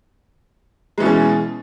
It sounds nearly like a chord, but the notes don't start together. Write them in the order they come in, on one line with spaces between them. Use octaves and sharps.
G#3 E3 B2 C#4